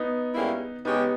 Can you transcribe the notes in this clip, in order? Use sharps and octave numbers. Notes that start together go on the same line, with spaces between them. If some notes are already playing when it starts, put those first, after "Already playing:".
Already playing: B3 D#4
G#2 G3 A#3 C#4 E4
C#3 G#3 B3 C#4 D#4 G4